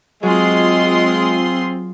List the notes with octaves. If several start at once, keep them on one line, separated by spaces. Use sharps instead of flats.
F#3 G#3 C4 F4 G#4 C6